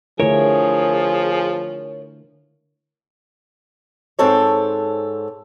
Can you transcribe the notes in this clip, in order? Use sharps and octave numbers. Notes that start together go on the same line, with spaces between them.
D3 F3 A3 E4 G#4 A#4 C#5
G#2 C4 A4 C#5